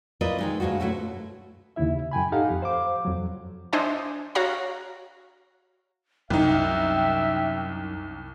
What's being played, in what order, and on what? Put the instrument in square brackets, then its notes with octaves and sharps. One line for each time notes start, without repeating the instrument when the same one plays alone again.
[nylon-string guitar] E4 F4 A#4 B4 D5 D#5
D#3 G#3 D#4
D2 G2 G#3 F4 F#4
F#2 B2 A3 E4 F#4
[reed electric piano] D#2 C#3 E4 E5
F#2 G5 G#5 B5
D#4 G4 A4 F5 F#5 A#5
F2
C5 F5 D6
F2 F#3
[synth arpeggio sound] D4 C5 D#5 E5 G#5
F#4 C#5 F5 A#5
[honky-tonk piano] C2 D#4 [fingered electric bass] F#2 [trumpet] E5 [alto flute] G5